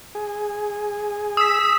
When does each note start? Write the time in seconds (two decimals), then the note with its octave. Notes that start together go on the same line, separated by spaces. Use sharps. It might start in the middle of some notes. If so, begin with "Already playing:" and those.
0.15 G#4
1.37 D#6 E6 B6